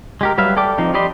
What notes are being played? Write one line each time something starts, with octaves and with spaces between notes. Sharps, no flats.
G#3 G4 A#4
F#3 G3 B4 E5 F5
A4 D5 G5 D6
F3 C4 D#4
G4 D5 D#5 B5 C6